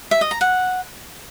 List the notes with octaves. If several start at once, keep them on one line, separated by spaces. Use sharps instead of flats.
E5
D#5
A#5
F#5